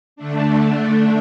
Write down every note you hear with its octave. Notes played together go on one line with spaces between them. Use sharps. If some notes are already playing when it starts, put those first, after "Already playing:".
D3 A3 D4